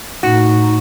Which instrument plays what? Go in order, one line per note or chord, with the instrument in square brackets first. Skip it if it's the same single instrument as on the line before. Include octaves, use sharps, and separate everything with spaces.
[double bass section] A2 [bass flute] D#4 [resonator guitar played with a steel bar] F#4